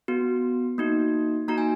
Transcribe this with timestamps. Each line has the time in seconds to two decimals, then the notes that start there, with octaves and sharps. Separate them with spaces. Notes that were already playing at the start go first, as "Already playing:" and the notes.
0.08 B3 F#4
0.78 A#3 D#4 F#4
1.48 A#3 D#4 F#4 A#5
1.58 G#5